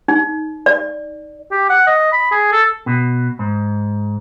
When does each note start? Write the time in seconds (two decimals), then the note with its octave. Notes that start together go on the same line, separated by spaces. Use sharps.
0.08 D#4
0.66 D5
1.51 G4
1.69 F#5
1.87 D#5
2.12 B5
2.31 G#4
2.52 A4
2.86 B2
3.39 G#2